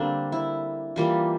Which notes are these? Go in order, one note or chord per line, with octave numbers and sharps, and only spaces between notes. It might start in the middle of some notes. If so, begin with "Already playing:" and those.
Already playing: D3 G3 A#3 C4 D4
E4
E3 G3 A#3 F4